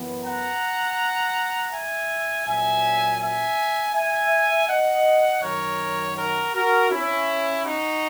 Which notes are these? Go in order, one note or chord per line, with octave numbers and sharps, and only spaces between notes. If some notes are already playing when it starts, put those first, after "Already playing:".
Already playing: F#2 E3 B3
F#5 A#5
E5 G#5
A#2 F#3 C#4 E5 G#5
E5 G#5
E5 G#5
D#5 F#5
F#2 D#3 F#3 C#4 A#4 C#5
F#4 A#4
F#4 A#4
C#4 E4
D#4 F#4